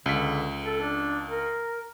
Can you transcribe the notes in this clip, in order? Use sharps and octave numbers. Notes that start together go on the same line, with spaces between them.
C#2 D3 B6
A4
D4
A#4